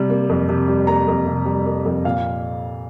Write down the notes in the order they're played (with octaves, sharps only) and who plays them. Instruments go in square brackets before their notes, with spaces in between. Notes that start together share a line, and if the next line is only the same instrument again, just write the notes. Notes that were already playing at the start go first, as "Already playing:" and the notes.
Already playing: [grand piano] C3 G3
A#3
F2
C3
G3
A#3 A#5
F2
C3
G3
A#3
F2
A#2 F5